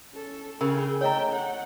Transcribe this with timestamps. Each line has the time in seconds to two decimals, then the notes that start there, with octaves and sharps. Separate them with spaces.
0.13 C#4 A4
0.61 C#3 G#4 A#4 G5 B5
1.01 A3 C#5 D#5 G5 A#5
1.32 F#5